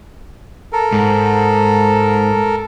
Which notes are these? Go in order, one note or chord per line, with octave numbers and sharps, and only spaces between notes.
A4 A#4
G#2